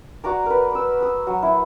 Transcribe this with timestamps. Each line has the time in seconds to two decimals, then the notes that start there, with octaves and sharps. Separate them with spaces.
0.24 F#4 D5 A#5 D6
0.46 A#4 B4
0.71 D6 E6
1.00 D#6 E6
1.27 F#3
1.43 E4